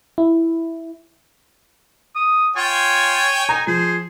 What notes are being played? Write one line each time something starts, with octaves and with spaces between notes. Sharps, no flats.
E4
D#6
F4 C#5 G5 G#5
D#4 A#5
F3 G#4 C5